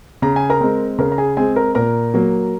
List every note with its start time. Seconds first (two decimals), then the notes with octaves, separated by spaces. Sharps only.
0.22 C#3 A#5
0.36 G#5
0.50 A#4 A#5
0.61 G#3 C4
0.99 C#3 A#4 A#5
1.12 A#5
1.18 G#4 G#5
1.37 G#3 C4 G#4 G#5
1.56 A#4 A#5
1.75 A#2 A#4 A#5
2.14 F#3 A#3